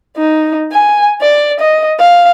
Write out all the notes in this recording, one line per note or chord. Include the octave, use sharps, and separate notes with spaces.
D#4
G#5
D5
D#5
F5